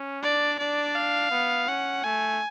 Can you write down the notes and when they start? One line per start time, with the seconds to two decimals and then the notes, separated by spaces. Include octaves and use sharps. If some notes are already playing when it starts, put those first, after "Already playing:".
Already playing: C#4
0.22 D4 D5
0.59 D4 D5
0.95 F5
1.31 B3
1.68 C#4 F#5
2.04 A3 G#5